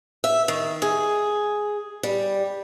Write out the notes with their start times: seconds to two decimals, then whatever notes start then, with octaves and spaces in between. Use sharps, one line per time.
0.24 E5
0.48 D#3
0.82 G#4
2.03 G3